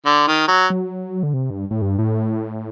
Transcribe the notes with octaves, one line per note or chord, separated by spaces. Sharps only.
D3
D#3
F#3
F#3
D3
C3
G2
A2
G2
A2